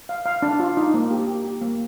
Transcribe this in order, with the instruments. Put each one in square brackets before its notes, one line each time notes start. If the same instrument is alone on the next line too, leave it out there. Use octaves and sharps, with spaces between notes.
[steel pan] F5
F5
D4
F4
D#4
A#3
G4
G4
G4
A#3